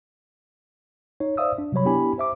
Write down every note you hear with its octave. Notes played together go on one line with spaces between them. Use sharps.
D#4 C#5
C5 D5 E5 F5 D#6 E6
D4
C3 F#3 G3 C#5 B5
B3 D4 E4 G4 G#5 B5
C5 E5 D6